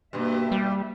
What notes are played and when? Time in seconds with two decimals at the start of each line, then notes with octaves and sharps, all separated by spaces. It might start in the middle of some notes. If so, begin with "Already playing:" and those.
0.13 G2 B2 A#3 E5
0.52 G3